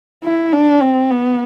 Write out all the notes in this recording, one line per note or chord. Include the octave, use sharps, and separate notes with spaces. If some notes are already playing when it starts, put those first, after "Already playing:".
E4
D4
C4
B3